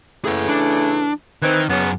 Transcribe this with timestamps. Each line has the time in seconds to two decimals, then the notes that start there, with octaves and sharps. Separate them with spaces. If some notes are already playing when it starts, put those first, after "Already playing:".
0.25 C#3 E3 A3 G#4 F#5
0.48 D4
1.42 D#3 E3 C4 B4
1.69 F#2 B3 C#4 G#4